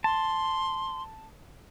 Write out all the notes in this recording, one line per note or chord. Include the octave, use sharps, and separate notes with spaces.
A5 C6